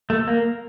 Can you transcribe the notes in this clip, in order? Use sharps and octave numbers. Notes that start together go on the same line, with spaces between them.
A3
A#3